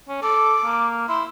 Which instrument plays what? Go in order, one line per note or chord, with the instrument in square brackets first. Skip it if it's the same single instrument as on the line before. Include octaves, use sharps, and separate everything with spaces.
[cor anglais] C#4
[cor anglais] A4 [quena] D6
[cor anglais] A#3
[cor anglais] E4 [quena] C6